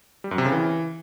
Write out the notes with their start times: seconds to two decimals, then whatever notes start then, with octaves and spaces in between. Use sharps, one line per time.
0.24 G3
0.31 F#2
0.38 C3
0.45 C#3
0.52 E3